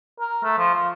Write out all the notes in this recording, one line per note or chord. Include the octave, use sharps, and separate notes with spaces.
A#4
A3
F3
F4